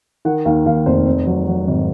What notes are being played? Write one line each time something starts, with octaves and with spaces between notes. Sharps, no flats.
D#3 F#5
D#2 F5
D#2 F5
F1 C5
C4
F#3
F#3
G#1